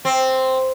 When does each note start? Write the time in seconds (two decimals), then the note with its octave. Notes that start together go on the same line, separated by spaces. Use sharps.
0.05 C4